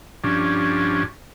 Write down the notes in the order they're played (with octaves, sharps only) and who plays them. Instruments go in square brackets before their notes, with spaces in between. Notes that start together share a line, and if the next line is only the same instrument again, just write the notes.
[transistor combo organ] G2 F3 C#4 D4